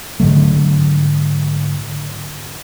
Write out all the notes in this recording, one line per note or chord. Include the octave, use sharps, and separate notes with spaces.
G#2 D3 F#3 A3